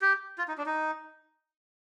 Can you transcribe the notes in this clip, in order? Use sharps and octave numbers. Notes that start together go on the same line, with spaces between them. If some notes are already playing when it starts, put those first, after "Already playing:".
G4
F4
D#4
D4
D#4